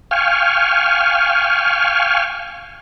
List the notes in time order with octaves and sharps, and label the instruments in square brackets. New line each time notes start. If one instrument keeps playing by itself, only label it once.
[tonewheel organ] F5 G5 G#5 C#6 F6